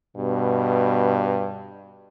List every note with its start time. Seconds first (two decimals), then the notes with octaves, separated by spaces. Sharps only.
0.17 G2 B2